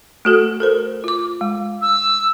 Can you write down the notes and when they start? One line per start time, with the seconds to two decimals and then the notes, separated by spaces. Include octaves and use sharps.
0.25 A3 F#4 A4
0.60 A4 A#4 C5
1.04 F4 D6
1.41 G#3
1.82 E6